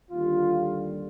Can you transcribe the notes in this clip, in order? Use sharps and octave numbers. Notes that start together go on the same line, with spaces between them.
D#2 D3 G3 F4